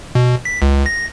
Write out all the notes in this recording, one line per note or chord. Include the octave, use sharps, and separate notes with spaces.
B2
B6
C#2
A#6